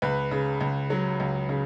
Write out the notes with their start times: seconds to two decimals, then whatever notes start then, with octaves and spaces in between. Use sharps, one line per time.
0.02 C#2 B4
0.31 C#3
0.61 C#2
0.90 F#3
1.20 C#2
1.49 C#3